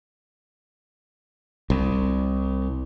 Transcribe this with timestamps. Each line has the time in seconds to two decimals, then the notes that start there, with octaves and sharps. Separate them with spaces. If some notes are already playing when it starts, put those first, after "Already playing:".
1.70 C2